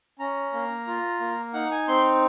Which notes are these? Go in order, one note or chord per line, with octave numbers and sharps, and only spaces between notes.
C#4 A#5
A#3
F4
A#3
D#4 F#5
G#5
C4 C6